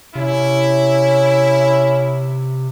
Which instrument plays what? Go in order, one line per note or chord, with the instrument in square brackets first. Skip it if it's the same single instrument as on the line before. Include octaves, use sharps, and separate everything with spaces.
[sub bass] C3 [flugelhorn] C#4 [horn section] E4